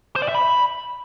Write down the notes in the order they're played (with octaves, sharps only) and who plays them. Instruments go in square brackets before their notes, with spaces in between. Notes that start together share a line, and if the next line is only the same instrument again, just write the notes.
[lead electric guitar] C5
D5
E5
B5